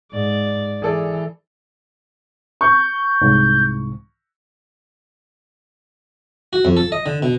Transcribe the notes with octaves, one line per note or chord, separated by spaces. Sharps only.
G#2 D5
E3 G#4 A4 D5
C#6 G6
C2 G#2
F#4
F2
A4
D#5
D3
B2